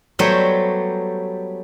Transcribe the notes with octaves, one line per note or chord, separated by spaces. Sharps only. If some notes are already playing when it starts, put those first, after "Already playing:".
F#3 G3 A3 B3 C5 C#5